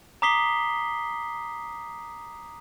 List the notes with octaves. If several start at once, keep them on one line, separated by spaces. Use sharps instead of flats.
A#5 D6 D#6 B6 C7 G7